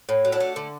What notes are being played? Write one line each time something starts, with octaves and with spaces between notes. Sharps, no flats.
A2
F#3
D4 E4
A3
D3